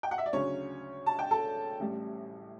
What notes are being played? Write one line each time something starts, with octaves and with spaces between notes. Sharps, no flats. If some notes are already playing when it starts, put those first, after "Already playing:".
G5
F#5
E5
D5
D2 C#3 F#3 C#4 C#5
A5
G5
A4 A5
A1 A2 G3